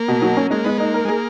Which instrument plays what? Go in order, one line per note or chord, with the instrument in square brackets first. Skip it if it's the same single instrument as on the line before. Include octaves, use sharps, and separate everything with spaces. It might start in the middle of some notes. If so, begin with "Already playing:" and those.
Already playing: [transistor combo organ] A#3
[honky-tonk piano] B2
F#3
C#4
[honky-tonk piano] G#3 [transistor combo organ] A#3
[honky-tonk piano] G#3 [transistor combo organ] B3
[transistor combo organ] A#3 [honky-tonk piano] D#4
[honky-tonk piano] A#4
[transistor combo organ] G#3
[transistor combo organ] A#3 [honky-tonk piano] G#4